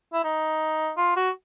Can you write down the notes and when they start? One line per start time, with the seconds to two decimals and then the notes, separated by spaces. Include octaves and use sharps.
0.13 E4
0.24 D#4
0.97 F4
1.16 F#4